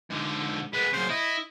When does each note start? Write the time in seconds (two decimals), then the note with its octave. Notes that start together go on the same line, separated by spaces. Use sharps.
0.10 G#2 D3
0.73 G#3 B3 B4
0.93 F#2 C#3 C5
1.10 E4 D#5